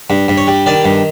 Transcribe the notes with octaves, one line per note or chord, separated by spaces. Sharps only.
G2
G2
C#5
G3
D#3 D5
G2